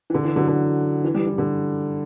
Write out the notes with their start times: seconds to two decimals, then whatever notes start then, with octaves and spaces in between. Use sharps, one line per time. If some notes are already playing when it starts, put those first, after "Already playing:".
0.10 E3
0.14 D3
0.25 E3
0.36 D3 F#3
0.48 D3
1.04 E3
1.14 E3 G3
1.26 E3
1.38 D3